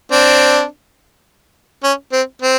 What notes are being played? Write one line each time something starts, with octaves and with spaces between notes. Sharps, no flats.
C4 D4
C#4
C4
C4